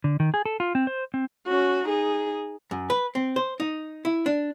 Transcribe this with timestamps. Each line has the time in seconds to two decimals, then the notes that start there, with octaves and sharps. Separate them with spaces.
0.04 D3
0.20 D#3
0.34 G#4
0.45 A4
0.60 F4
0.75 C4
0.87 C5
1.14 C4
1.48 C#4 F#4
1.86 D#4 G#4
2.71 F#2
2.90 B4
3.15 C4
3.36 C5
3.60 D#4
4.05 E4
4.26 D4